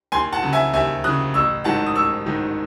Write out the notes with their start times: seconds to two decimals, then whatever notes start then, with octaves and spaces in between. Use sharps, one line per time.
0.12 D#2 G#5 C6
0.32 F#5 A5
0.43 C#3 F#3
0.53 E5 G#5
0.73 D#2 E5 G#5
1.04 C#3 F#3 D#6 F#6
1.34 A1 C#6 E6
1.64 G#2 D#3 F#3 F#5 A5
1.87 D#6
1.95 A1 C#6 E6
2.26 G#2 D#3 F#3